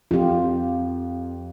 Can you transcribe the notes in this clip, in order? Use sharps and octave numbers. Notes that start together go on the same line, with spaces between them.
F2 F4 G4